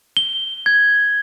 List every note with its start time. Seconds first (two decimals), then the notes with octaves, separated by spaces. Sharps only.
0.17 G7
0.66 G#6